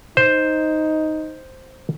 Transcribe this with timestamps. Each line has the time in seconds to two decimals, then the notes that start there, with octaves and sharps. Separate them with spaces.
0.17 D#4 C5